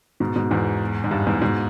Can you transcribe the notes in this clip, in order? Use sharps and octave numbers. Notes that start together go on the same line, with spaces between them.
G#2 B2
G#2 B2
E2 G#2
G#2
G2
E2 G#2
G#2 B2